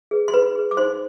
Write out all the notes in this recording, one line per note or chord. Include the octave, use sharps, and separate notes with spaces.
G#4 B4
C6
D#4 B4 B5
G#4 B4
D6
D#4 C5 C6